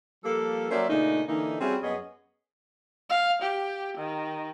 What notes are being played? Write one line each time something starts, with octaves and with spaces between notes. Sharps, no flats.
F3 G3 A#3 A4
F#3 A#3 C#4 C5 D5 E5
A#2 C#3 A3 D4 D#4
D3 E3 A#3 D#4
G3 C4 C#4 E4 F#4 G#4
F#2 B3 G#4 C#5 D#5
F5
G4
D#3